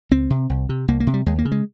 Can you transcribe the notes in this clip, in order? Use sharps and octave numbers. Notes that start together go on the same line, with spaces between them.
C#2 C4
C3
C2
C3
C2 A#3
A#3
C3
G3
D#2 G#3
A#3
C#3
G#3